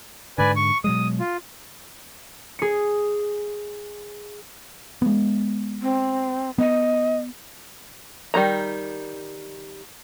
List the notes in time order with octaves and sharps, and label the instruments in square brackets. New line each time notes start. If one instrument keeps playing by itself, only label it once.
[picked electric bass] G#2 D3 [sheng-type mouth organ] B4 D5 G#5
[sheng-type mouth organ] C#6
[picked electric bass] B2 F#3 G#3 [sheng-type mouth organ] D#6
[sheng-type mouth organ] F4
[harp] G#4 C#7
[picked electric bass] G#3 B3
[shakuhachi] C4
[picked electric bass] B3 [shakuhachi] D#5
[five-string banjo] D#3 G3 A#3 A#5